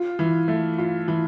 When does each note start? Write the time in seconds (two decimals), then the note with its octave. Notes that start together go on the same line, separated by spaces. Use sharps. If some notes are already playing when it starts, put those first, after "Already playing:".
Already playing: F4
0.19 E3
0.48 A3
0.78 F4
1.08 E3